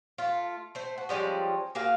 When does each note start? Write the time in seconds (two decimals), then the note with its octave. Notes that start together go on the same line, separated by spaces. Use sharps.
0.18 A3 F4
0.75 A3 C5
0.98 F#4
1.09 F3 G3 G#3 C#4
1.75 A#3 F#4 G#4 F5